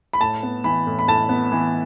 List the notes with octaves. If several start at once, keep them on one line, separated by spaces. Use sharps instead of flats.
B5
A2 A5
B3
E3 B5
A2
B5
A2 A5
B3
E3